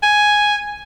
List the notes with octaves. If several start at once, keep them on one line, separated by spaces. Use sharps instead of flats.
G#5